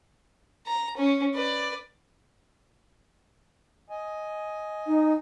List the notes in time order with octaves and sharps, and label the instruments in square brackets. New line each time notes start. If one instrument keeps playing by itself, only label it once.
[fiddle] A#5
C#4
B4 D5
[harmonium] D#5 G#5
[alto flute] D#4